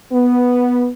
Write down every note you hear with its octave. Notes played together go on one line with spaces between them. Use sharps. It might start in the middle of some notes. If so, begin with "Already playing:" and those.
B3